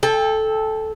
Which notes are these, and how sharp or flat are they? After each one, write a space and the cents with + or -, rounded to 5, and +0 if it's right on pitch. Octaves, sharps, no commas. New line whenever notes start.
A4 -10 G5 +30